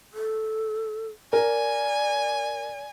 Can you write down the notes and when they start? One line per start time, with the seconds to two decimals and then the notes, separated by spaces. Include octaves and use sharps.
0.14 A4
1.33 A#4 D5 G#5